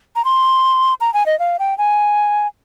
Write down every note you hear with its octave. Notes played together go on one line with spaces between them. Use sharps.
A#5
C6
A#5
G#5
D#5
F5
G5
G#5